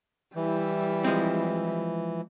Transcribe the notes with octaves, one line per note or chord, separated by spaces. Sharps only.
E3 G3 E4
F3 G#3 C4